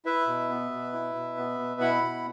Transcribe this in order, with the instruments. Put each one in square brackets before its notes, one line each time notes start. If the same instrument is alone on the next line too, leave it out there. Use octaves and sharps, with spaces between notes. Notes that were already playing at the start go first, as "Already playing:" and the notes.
[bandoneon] E4 B4 E5
B2
B3
B2
E4
B2
B3
B2
E4 F#5 B5
B2